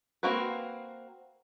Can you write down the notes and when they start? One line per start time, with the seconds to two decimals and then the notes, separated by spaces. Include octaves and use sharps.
0.23 A#3 C4 F#4 A#4 B4